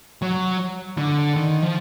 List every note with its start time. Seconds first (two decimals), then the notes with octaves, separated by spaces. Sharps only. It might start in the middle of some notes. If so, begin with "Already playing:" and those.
0.22 F#3
0.98 D3
1.36 D#3
1.62 F3